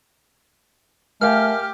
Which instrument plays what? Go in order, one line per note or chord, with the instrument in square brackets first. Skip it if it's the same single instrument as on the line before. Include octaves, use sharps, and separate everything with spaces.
[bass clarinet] A3 [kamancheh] G4 [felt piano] A#4 F5 G#5 [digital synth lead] F6